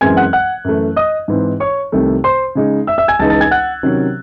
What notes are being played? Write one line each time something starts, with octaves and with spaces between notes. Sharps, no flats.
F#2 E3 G#3 C4 G#5 G#6
F#5 F#6
F#5 F#6
F#2 E3 A3
D#5 D#6
G#2 E3 C4 D#4
C#5 C#6
C2 C3 D#3 A3
C5 C6
C#3 G#3 D#4
E5 E6
E5 E6
G#5 G#6
C#2 C#3 E3 G#3 D#4 A5 A6
A5 A6
G#5 G#6
F#5 F#6
C3 D#3 F#3 C#4